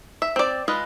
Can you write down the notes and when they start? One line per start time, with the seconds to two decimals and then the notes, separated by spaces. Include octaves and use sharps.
0.22 E5
0.36 C4 D5
0.68 G#3 F4 B4 D#5